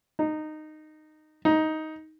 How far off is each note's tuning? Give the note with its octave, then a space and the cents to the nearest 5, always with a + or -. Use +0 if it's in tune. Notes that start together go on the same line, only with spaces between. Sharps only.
D#4 -15
D#4 +10